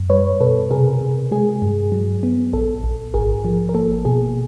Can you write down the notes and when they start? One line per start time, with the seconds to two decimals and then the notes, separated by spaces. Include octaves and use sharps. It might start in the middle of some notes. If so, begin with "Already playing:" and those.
Already playing: F#2
0.10 G3 B4 C#5
0.41 B2 A4 B4
0.71 C3 G#4 A#4
1.01 C3
1.31 G#3 G#4
1.62 G2
1.92 F#3
2.23 B3
2.53 A#1 A4
2.84 A#1
3.14 G#1 G#4 A#4
3.45 F3
3.69 A#4
3.74 A#3 A4
4.05 B2 G#4